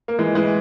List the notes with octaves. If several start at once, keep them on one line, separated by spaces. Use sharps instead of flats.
A#3
E3 G#3
E3 G#3